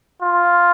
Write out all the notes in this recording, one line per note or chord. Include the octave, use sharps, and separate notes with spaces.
F4